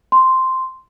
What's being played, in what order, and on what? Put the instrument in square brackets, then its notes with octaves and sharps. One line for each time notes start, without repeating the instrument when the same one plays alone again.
[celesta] C6